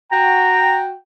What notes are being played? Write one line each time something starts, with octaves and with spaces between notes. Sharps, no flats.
F#4 G5 A#5